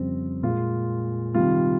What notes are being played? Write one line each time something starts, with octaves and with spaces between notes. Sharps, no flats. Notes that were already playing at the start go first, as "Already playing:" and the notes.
Already playing: F2 C#3 G3 C4
A#2 G#3 F4
C3 D#3 G3 F4